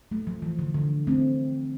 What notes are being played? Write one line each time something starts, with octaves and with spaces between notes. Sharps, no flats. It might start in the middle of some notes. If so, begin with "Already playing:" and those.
A3
F3
E3
D3
D3
A3 C4